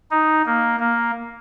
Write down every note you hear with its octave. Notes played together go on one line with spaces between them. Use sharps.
D#4
A#3
A#3